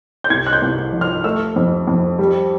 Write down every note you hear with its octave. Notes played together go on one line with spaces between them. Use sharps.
G6
C2 G#6
F#6
G6
C2
F3
F6
A3 E6
F2
F2
G3